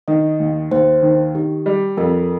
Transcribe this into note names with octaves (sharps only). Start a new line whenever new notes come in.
D#3 D#5
D#2
D#2 C5
D#3
D#3 G4
G3
F2 A#4